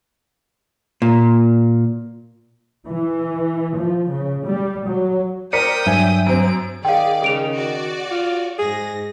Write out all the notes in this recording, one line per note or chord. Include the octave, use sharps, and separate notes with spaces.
A#2
E3
F3
C#3
G3
F#3
A#4 C5 D5 G5 D#6 B6 C#7
G2 F#3 E5 G#5
F#2 C4 D7
D#3 G#4 D5 F5 G5
C#3 G#4 D7 F7
F#4 D5
F4
G#2 G#4 A#6